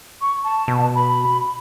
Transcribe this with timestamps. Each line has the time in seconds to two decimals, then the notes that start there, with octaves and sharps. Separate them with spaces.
0.22 C#6
0.44 A5
0.68 B2
0.95 B5